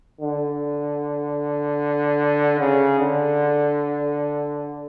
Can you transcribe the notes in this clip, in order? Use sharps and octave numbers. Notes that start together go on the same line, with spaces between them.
D3
C#3
D3